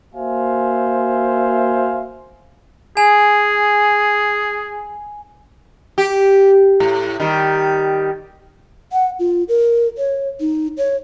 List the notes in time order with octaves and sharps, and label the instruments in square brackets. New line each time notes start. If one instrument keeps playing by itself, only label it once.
[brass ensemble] A#3 F#4 C5 E5 F5 G#5
[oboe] G#4 [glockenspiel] G#5
[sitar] G4
A2
D#3 G3
[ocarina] F#5
F4
A#4
C#5
D#4
C#5